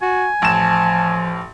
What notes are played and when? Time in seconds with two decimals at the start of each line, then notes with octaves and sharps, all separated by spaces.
0.02 F#4 G#5
0.42 A1 F3 A5 E7